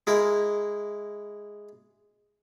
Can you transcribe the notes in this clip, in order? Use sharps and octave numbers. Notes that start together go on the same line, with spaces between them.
G#3 E4 A#4